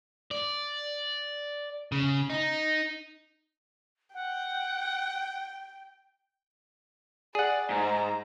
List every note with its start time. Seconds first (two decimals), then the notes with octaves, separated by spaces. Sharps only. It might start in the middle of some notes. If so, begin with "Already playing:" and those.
0.31 D5
1.92 C#3
2.30 D#4
4.14 F#5 G5
7.35 G#4 D5 F#5
7.70 G#2 A#5